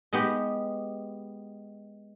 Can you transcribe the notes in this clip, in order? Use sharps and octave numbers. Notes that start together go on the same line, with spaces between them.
G#3 B3 G4